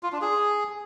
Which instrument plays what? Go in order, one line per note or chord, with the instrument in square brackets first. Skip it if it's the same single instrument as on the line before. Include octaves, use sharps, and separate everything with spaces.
[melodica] F4
D4
G#4